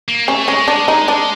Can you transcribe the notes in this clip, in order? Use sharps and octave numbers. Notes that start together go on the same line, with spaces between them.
A#3
A3 C#4
G#3 C#4
D4
D#4
D4